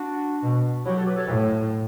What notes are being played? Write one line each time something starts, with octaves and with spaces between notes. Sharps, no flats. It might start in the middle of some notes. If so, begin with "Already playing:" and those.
Already playing: D4 F#4
B2
F#3 E4 G4
F#4 A4
G4 B4
A4 C#5
A2